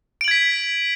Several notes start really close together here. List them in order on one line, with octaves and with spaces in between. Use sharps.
D7 F#7 G#6 B6